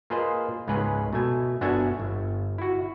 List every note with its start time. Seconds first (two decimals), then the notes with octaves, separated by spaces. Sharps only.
0.10 A#3 F4 G#4 B4 C5 D#5
0.68 C#2 G#2 C#4 G#4 B4
1.13 B2 A3 G#5
1.61 G1 B3 D4 F#4 E5 G#5
2.00 G1
2.58 E4 F#4